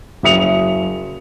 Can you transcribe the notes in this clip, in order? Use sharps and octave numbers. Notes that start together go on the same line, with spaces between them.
F#1 F#3 E5 D#6 C#7 F7